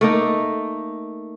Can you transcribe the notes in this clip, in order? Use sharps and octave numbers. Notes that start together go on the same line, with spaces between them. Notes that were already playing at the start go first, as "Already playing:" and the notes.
A3 A#3 D#4